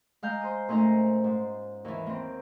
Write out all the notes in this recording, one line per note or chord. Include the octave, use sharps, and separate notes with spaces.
G#3 F5 A#5 G6
C5 D#6
A#2 A3 C#4 D#4 C5 A#5
G#2
D#2 E3
A#3 C4